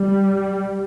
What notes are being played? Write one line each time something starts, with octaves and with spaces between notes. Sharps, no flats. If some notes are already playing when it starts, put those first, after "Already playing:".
Already playing: G3